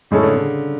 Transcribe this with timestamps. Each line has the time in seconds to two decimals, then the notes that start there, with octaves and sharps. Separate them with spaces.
0.11 A2 C#3 G#3 C#4 E4 A4
0.23 D3
0.35 C#3